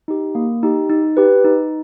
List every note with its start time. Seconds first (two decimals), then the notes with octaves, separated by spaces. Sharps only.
0.08 D#4 G4
0.35 A#3
0.63 D#4 G4
0.89 D#4
1.17 G4 B4
1.45 D#4